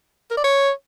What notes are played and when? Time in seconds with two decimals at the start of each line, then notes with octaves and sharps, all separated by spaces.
0.31 A#4
0.37 D5
0.44 C#5